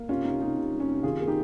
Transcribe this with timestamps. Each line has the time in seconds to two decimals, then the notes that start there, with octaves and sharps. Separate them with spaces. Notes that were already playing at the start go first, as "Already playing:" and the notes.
Already playing: A#3
0.09 C3 C#4 F4
0.24 C3 D#4
0.41 C3 D#4
0.56 C3
0.73 G3
0.80 C#4
0.88 C3
1.03 D#3 F4 G#4
1.20 A#3 G#4
1.27 D#4 G4